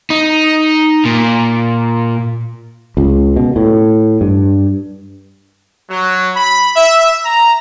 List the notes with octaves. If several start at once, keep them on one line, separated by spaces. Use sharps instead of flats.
D#4
A#2
C#2
B2
A2
G2
F#3
B5
E5
A#5